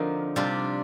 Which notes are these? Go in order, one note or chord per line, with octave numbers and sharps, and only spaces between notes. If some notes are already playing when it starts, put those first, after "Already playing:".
Already playing: D3 F3 C4 D#4 A#4
C3 G3 D4 F4